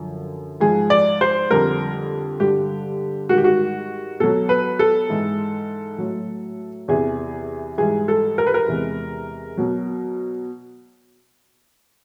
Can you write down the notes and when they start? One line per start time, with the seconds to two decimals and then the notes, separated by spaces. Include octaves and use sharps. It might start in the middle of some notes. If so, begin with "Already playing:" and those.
Already playing: F#2 D3 F3
0.61 G#2 F3 G#3 G#4
0.90 D5
1.21 C5
1.51 F2 D3 G3 A#4
2.40 G2 D3 G3 G4
3.29 G#2 D#3 G3 F#4
3.38 G4
3.44 F#4
4.20 B2 F#3 A4
4.49 B4
4.79 A4
5.09 G#2 E3 G#3
5.98 A2 F#3
6.88 E2 C3 E3 G#4
7.78 G#2 E3 G3 G#4
8.08 A4
8.38 A#4
8.47 B4
8.54 A#4
8.68 E2 C3 E3 G#3
9.57 B2 F#3